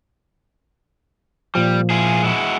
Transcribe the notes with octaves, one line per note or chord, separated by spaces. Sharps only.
A#2 F3 G3
E4 F4 G#4
G#3 E4 F#4